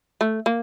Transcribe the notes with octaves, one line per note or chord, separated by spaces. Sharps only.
A3
A#3